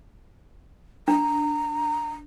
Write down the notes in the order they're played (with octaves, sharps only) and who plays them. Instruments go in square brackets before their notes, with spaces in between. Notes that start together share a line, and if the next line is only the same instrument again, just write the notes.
[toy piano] D4 [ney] A#5